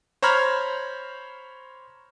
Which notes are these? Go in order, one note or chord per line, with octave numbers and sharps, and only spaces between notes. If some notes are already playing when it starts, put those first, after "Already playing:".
C5 C#5 A#5 B5 F6 G#6